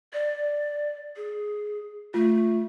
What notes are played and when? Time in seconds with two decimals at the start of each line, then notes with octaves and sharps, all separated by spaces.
0.13 D5
1.17 G#4
2.14 A3 F4